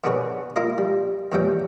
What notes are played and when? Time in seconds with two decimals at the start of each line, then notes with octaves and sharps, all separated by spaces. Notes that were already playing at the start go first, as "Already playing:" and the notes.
0.04 D#3 B3 D4 G#4 B4 C#5
0.56 A#3 E4 F4 A#4 D#5
0.78 G3
1.32 E2 A#2 E3 G3 C#4 G5